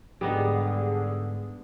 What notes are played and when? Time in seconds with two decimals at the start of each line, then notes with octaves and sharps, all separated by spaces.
0.21 G#2 D3 G3 B3 D#4 G#4